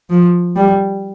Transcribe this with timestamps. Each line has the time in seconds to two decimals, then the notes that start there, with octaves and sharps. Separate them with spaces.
0.10 F3
0.55 G3